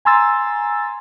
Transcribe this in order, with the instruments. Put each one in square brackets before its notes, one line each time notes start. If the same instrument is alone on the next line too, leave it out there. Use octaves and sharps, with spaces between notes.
[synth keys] G#5 A#5 C6 E6 A6